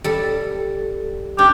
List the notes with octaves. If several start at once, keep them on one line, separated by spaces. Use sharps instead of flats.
G3 A4
D4 G4